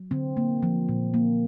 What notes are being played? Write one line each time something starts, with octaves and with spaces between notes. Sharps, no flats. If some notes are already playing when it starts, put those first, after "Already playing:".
Already playing: F#3
D3 C4
A#3
F3
A#2
A#3